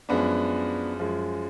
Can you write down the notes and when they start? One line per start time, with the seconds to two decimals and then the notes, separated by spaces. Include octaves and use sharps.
0.09 F#2 F3 G#3 B3 D4
0.99 F#2 F3 G#3